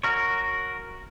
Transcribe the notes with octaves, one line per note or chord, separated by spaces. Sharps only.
F#4 A#4 C#5